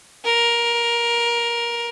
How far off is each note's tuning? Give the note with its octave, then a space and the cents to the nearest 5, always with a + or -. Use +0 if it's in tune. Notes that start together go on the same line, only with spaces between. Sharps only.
A#4 +15